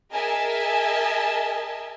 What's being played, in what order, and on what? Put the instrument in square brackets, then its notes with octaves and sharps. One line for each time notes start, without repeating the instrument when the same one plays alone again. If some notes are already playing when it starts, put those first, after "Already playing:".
[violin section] G#4 A#4 D#5 E5 G#5 A5